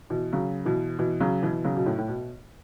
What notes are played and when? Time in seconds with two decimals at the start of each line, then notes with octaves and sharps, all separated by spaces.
0.10 B2 E3
0.33 C#3 F#3
0.65 B2 E3
0.99 B2 E3
1.20 C#3 F#3
1.43 B2 E3
1.65 C#3 F#3
1.77 B2
1.86 A2
1.98 A2
2.08 B2